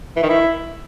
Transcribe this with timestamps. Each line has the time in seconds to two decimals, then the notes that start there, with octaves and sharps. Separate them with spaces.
0.16 E3
0.23 D#3
0.29 E4